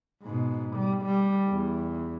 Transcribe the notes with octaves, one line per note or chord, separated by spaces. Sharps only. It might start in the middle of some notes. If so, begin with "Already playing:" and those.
G#2 B2
G3
G3
E2